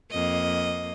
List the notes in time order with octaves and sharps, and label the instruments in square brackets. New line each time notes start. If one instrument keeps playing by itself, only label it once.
[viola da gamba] F2 A#3 D#5